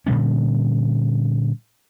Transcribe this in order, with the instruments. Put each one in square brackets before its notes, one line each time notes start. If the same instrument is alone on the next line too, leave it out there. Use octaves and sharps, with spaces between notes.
[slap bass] A#2 D3 G3 C#4